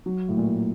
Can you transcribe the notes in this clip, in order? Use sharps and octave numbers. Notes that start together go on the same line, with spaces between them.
F#3
A2
A#2